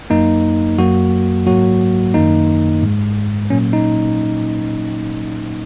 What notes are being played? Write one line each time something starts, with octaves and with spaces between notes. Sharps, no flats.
F#2 F#3 A#3 D#4
F#2 F#3 A#3 F#4
G#2 F#3 A#3 F#4
F#2 D#3 A#3 D#4
G#2 G#3
A#2 F#3 A#3 C#4
D#4